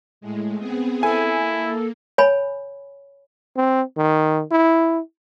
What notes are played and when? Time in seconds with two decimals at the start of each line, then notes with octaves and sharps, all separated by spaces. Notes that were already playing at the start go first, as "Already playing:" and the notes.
0.21 A2 G#3
0.59 B3 C4 G#4
1.03 E4 A4 G#5
1.39 A#3
2.18 C#5 G#5 B5
3.57 C4
3.97 D#3
4.51 E4